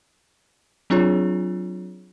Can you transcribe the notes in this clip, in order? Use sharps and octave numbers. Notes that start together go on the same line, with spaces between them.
F#3 C4 D4 F4 G#4 C#5